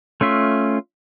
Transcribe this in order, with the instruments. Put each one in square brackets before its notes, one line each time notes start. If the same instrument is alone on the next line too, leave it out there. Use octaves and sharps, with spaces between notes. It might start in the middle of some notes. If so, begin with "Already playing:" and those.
[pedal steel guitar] A3 C#4 F4 E5